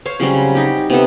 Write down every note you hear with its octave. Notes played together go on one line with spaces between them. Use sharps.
C5 C#5 F5
C#3 F#3 G3 C4
D#4 G4
C3 B3 A4